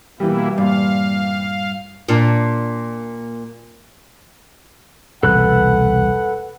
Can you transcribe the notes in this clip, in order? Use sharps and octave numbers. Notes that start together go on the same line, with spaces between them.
B2 E3 G3 A#3 E4
G2 A#2 F5
A#2 D4
E1 C2 A4 B4 F#5 F#6